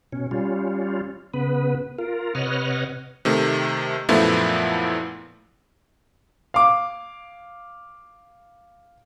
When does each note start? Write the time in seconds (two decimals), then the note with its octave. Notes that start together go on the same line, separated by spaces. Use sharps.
0.13 B2 C#4
0.31 G3 C#4 F4
1.34 C#3 B3 B4
1.98 F4 A#4
2.35 C3 B4 C#5 D#5 F#5 F6
3.25 C3 D#3 A3
4.09 F#2 A#2 F3 A3 B3 E4
6.54 F5 D6